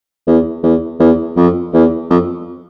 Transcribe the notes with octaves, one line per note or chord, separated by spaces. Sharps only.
E2
E2
E2
F2
E2
F2